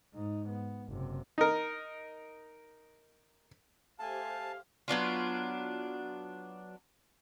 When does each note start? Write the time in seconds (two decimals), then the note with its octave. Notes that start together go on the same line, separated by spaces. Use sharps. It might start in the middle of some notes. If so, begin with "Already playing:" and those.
0.14 G#2 D#4
0.49 B3
0.89 F#1 C3
1.38 D#4 A#4
3.99 A3 G4 C5 F5 G#5 A5
4.88 F#3 B3 D4 F4